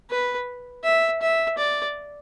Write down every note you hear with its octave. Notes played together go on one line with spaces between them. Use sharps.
B4
E5
E5
D5